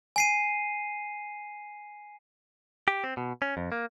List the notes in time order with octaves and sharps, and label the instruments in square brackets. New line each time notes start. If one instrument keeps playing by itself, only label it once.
[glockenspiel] G#5 C7 D#7
[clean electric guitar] G4
C4
B2
C#4
F2
A#3